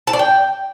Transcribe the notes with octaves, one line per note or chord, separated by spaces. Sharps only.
A5
D5
G5